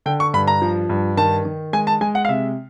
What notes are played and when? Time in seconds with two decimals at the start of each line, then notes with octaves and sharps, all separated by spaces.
0.06 D3 G5
0.20 C#6
0.34 G2 B5
0.47 A#5
0.62 F3
0.89 G2
1.17 D#3 A5
1.45 D#3
1.73 G#3 G#5
1.87 A5
2.01 G#3 G#5
2.15 F#5
2.25 F5
2.29 C3 E5